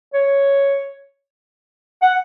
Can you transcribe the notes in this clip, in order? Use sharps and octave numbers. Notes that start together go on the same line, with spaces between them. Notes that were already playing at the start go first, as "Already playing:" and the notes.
C#5
F#5